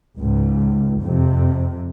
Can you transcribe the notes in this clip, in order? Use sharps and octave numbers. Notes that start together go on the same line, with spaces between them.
C#2 G#2
F2 C3